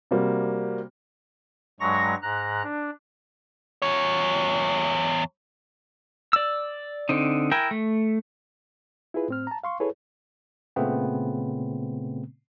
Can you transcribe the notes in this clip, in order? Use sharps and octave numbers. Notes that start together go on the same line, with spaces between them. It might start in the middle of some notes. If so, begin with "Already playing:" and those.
C3 G3 A#3 F#4
G2 F#3 G#3 A#5 C#6 A#6
G#2 A#5 F#6
D4
E2 C#5
D5 E6
D3 C4 D#4
E4 A#4 G5 G#5
A3
E4 F4 G#4 B4
A2 C4 F6
A5 A#5
F5 C6 C#6
E4 G#4 A4 B4 C#5
A#2 C#3 A3 B3 C4